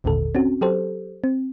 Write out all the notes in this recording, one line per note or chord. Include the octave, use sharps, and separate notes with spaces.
G#1 D#2 A#2 D3 A4
C4 C#4 F#4
F#3 G4 A4 C5
C4